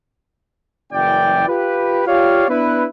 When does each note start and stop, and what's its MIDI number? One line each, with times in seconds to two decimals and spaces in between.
0.92 1.46 30
0.92 1.46 42
0.92 1.46 52
0.92 1.46 74
0.92 1.46 79
1.48 2.03 65
1.48 2.03 67
1.48 2.03 71
2.06 2.47 65
2.06 2.47 67
2.06 2.47 73
2.06 2.47 74
2.06 2.47 77
2.49 2.86 59
2.49 2.86 62
2.49 2.86 64
2.49 2.86 71